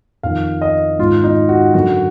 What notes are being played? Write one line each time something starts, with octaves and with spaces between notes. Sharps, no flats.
F2 D#3 F5
D#5
G#2 D#3 F4
D#4
F#4
F#2 D3 F#4